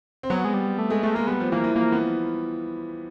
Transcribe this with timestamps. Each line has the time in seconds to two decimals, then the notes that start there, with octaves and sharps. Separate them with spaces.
0.23 C4
0.30 F#3 B3
0.45 G#3
0.54 G3
0.79 A3
0.90 G#3 A3
1.03 G#3 A3
1.15 G#3 A#3
1.27 G3 B3
1.40 F3
1.52 E3 A#3
1.64 E3
1.76 F3 A#3
1.92 B3